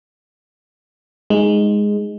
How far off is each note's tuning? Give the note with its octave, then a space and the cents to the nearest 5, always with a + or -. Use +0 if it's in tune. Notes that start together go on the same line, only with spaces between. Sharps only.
G#3 +0 D#4 +0